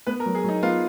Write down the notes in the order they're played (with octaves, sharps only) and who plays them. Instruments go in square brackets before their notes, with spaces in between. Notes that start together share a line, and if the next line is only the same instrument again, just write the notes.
[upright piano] B3 [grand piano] B4
[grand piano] A#4
[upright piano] F#3
[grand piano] G#4
[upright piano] F#3 [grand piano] D#4
[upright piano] B3 [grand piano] F4